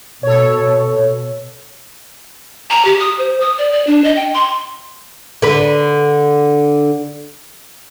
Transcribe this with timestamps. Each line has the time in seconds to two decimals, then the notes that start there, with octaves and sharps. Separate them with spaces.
0.23 B2 A4 C#5
2.70 A#5
2.85 G4
3.00 D#6
3.18 C5
3.40 D#6
3.58 D5
3.72 D5
3.87 D4
4.04 D#5
4.16 G5
4.34 C6
5.42 D3 B4